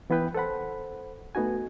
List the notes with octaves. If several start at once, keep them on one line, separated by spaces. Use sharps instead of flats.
E3 B3 E4 B4 G5
A4 C5 F#5 B5
A3 B3 D#4 F#4 G#5